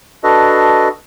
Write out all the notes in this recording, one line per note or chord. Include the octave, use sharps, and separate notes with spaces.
D4 F#4 A4 B4 D#5